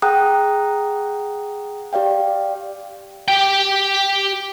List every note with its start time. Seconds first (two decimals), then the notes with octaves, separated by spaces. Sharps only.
0.02 G#4 F#5 G5 A#5 D#6 F#6
1.93 G4 D5 F5 G5
3.28 G4 G5